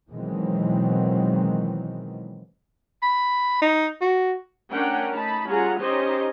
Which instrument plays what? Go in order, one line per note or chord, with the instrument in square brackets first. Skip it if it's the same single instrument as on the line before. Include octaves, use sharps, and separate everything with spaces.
[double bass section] B2 D#3 E3 F#3 G#3 C4
[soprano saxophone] B5
D#4
F#4
[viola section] A3 C#4 D4 A#4 F#5 G5
A3 D#4 A5 B5
G3 C#4 F4 G#4 F#5 A#5
C#4 D#4 G4 C5 C#5 D#5